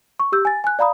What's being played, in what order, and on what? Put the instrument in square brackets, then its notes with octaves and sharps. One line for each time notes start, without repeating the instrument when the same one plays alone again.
[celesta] C#6
G4 E6 G6
G#5 A6
G#5 F#6
D5 F5 A#5 B5 D#6